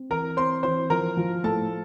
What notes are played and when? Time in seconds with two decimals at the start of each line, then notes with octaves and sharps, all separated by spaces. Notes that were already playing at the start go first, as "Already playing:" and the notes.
Already playing: C4
0.10 E3 A#4 A#5
0.36 C4 C5 C6
0.63 E3 C5 C6
0.90 F3 A#4 A#5
1.17 F3
1.44 A2 A4 A5